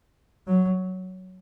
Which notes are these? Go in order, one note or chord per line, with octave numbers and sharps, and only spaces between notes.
F#3